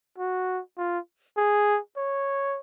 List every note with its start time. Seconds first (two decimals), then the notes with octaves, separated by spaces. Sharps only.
0.18 F#4
0.78 F4
1.37 G#4
1.97 C#5